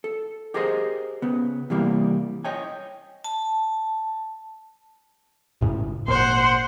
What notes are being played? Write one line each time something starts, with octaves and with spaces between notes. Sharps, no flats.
A4
G4 G#4 A#4 C5 D#5
C#3 B3
C3 E3 G3 A#3
C#5 D#5 G5 G#5
A5
G#1 A2 C#3
G#1 A#2 C5 F#5